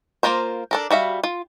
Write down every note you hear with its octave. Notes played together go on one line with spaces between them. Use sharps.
A#3 C4 F4 A#4 C5
D4 A4 A#4
G3 F#4 E5 F5
F4